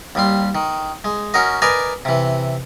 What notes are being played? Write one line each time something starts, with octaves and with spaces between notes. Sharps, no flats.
D#2 G3 C6
D#3
G#3
C#4 F#4 A#4 D#5
A#4 B4 D5 D#5 G#5 A#5
C3 E3